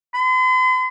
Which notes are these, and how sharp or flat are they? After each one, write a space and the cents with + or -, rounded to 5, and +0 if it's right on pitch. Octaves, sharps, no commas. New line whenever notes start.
C6 -45